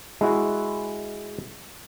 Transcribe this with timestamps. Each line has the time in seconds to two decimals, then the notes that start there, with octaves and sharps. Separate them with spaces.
0.21 G#3 E4 F#4